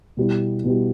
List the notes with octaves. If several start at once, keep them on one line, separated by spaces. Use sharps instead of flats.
B2 G3 B3 E4 G4
B2 G3 B3 E4 G4